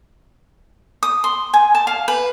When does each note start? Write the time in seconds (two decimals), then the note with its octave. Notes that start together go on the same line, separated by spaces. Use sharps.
1.03 D#6
1.24 C6
1.54 G#5
1.75 A5
1.87 F5
2.08 B4